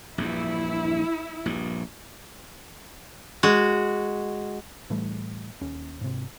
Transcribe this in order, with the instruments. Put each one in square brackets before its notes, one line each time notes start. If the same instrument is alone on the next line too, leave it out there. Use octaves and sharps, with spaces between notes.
[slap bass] A#1 E2 G2 [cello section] E4
[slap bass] A#1 G2
[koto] G#3 F#4
[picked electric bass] A2 E3 G3 A3
D#2 C#4
G#2 C3